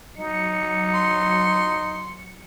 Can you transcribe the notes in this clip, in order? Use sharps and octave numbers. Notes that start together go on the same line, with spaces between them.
F#3 D#4 C#7
C6